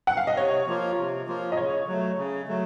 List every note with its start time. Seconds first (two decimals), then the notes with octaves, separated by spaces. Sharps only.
0.07 F#5
0.17 F5
0.27 D#5
0.37 C3 C#5
0.67 F3 A#3 F4
0.98 C3
1.27 F3 A#3 F4
1.52 D#5
1.57 C#3 C#5
1.88 F#3 A3
2.18 C#3
2.47 F#3 A3